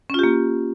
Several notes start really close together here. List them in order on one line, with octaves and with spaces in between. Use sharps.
C#4 F4 G4 A#3